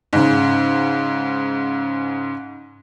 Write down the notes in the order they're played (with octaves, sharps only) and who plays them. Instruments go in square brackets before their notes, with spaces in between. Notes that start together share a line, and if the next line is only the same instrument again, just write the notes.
[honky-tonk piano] G#2 C#3